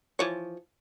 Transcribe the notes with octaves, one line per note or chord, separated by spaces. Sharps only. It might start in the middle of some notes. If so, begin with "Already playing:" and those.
E3 F3 C#5